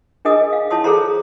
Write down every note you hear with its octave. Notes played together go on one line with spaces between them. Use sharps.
D4 G#4 A#4 D#5 G#5 D#6
F5
E4 C#5 A5 C6 D#6
G#4 A4 C5 C#5 A#5 C6